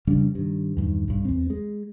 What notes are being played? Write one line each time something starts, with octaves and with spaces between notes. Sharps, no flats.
F2 C#3 G3 D4
G2 D#3
E2 G2 D#3
B1 G2
E2 C4
G#3